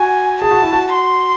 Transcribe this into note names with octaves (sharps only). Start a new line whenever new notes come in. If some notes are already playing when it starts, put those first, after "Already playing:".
Already playing: F#4 G#5
G#4 A5
F#4
E4
F#4
C6